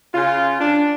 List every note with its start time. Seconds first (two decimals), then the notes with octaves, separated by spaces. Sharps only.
0.15 C#3 F4
0.60 D4